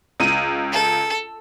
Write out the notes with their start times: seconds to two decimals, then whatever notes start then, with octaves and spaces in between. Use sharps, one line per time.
0.20 C#2 D#7
0.72 A4